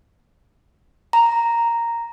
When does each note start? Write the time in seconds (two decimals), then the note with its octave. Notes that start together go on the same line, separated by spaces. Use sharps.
1.13 A#5